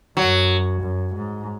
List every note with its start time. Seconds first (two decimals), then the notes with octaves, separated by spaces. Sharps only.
0.17 F#2 F#3
0.81 F#2
1.15 G#2